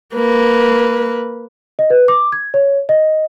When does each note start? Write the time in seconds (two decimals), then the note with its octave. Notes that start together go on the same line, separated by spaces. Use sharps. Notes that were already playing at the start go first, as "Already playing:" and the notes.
0.14 A#3 B4
1.79 D#5
1.90 B4
2.08 D6
2.32 G#6
2.54 C#5
2.89 D#5